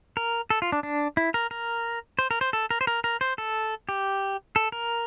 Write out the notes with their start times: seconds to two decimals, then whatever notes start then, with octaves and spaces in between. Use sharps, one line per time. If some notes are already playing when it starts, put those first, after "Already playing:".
0.17 A#4
0.50 A4
0.62 F4
0.72 D4
0.83 D4
1.17 E4
1.34 A#4
1.51 A#4
2.19 C5
2.31 A#4
2.41 C5
2.53 A4
2.70 A#4
2.81 C5
2.87 A#4
3.04 A#4
3.21 C5
3.38 A4
3.89 G4
4.56 A4
4.72 A#4